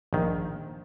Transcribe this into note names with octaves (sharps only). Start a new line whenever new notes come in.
A#1 D#3